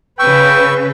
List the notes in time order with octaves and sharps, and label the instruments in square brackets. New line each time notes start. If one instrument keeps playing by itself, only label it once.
[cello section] C#3 B4 [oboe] G5 [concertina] C#6 E6